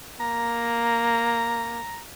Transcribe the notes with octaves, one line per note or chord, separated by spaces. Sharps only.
A#3 A#5